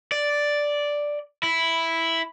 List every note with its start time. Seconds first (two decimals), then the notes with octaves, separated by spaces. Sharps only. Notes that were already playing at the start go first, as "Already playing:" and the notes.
0.12 D5
1.43 E4